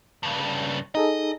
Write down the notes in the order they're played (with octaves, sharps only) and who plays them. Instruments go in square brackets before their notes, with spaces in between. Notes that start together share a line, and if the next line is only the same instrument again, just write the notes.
[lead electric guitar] G2 C#3
[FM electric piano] D#4 G#4 A4 [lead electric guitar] D#5